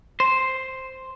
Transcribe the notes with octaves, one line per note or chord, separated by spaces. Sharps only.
C5